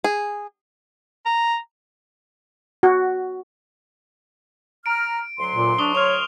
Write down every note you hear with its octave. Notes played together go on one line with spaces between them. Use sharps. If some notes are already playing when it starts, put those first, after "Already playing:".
G#4
A#5
F#4
A#5 F6 D7
D2 F#3 C6
A#2
D4 C#6 D#6 G7
C#5 F6 F7